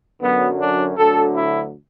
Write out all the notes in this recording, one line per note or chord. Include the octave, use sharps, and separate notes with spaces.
F#2 D3 F#3 B3
D4
D2 D3 F#3 A4
E4